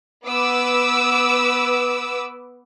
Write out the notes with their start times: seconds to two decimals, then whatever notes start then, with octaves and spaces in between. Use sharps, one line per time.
0.24 B3 B4 D6 E6